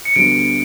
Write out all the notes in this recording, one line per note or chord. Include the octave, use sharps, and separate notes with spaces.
C#7
D2 D3 G3 B3 D7